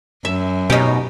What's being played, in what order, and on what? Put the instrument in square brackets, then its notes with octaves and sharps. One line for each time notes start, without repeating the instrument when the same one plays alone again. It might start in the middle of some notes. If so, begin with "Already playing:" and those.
[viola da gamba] F#2 [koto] E5
[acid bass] B2 [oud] C#4 D#4 [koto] G4